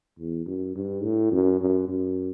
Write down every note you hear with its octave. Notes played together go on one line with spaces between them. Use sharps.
E2
F#2
G2
A2
F#2
F#2
F#2